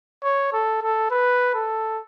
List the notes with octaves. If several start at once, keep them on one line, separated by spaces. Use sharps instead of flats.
C#5
A4
A4
B4
A4